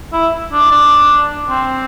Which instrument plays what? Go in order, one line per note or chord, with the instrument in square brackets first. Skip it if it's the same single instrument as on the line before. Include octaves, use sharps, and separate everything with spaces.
[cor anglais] E4
D4
D4
C4